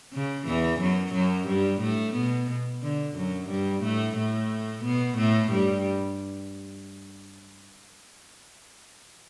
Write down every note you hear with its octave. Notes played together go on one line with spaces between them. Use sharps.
C#3
E2 E3
F#2 F#3
F#2 F#3
G2 G3
A2 A3
B2 B3
D3
F#2 F#3
G2 G3
A2 A3
A2 A3
B2 B3
A2 A3
G2 G3